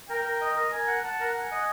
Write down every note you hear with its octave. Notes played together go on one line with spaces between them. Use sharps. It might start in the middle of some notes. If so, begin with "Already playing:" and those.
A#4 G5
A#4
D#5
A#4
A#4 G#5
F#5
F#5 A5
A#4
F#5 G#5
D#5